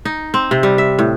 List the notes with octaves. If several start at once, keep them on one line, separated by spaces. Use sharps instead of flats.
D#4
C4
C3
G3
E5
A2